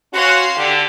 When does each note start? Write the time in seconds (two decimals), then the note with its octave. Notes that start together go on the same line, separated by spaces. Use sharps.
0.13 C#4 F#4 F5 C6
0.57 D3 G4